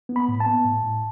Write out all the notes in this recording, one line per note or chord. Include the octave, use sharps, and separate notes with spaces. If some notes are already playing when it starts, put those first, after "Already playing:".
B3
B5
A2
A5
B3
A2
A2